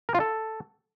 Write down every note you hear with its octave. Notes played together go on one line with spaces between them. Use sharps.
A#4
F4
A4